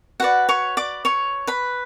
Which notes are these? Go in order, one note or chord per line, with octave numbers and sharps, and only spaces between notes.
F#4 B4 D5 F#5
C#5 C#6
D5 D6
C#5 C#6
B4 B5